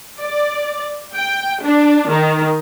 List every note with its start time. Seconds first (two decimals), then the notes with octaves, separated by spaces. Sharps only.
0.21 D5
1.15 G5
1.63 D4
2.10 D#3